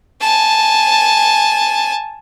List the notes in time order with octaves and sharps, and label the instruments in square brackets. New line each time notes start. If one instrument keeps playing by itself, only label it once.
[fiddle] G#5 A5